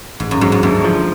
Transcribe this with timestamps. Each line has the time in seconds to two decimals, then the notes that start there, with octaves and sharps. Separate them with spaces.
0.20 A1 G#2
0.31 F#2
0.41 G#2 F#3
0.52 F#2
0.63 D2 G#2
0.84 F3